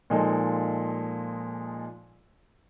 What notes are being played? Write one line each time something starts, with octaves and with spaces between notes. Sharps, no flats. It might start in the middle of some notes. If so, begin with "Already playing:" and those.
A#2 F3 G#3 D#4 A4